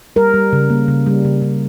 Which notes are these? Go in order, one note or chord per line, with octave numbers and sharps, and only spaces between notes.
G3 A#4
G3
C#3
A#3
C#3
G3
C#3
C#3